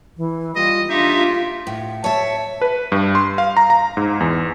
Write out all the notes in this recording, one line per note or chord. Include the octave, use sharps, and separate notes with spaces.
E3
G3 F4 D#5
D4 D#4 F4 G4 E5
A2
C#5 E5 A5
B4
G2
C6
F5
A#5
A#5
G#2
E2